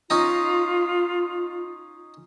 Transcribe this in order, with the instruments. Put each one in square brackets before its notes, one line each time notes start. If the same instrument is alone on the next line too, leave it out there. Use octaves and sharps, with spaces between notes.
[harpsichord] C#4 D#4 A#5 [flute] F4